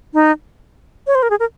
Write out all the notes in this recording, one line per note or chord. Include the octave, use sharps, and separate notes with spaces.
D#4
C#5
C5
A#4
G#4
A#4